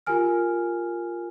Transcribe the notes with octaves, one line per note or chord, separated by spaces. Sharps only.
F4 G4 A#4 G#5 F6